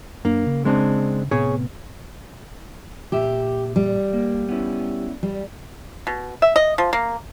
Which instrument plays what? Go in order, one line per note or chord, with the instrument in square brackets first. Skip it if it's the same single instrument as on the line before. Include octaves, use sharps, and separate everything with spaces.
[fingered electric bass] F#2 D4 [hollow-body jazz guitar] A#3
[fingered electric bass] C#3
[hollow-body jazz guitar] G#3 C4 D4
[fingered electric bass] A2 C3 B3 [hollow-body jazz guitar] G#4 C#5
[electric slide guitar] A#2 E5 [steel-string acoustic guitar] G4
[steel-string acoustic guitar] G3
[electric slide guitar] A#3
B3 C#4 E4
[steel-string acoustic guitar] G3
[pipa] B2
E5
D#5
F3
A#3